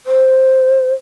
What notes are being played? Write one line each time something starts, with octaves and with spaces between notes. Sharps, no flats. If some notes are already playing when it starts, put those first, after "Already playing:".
C5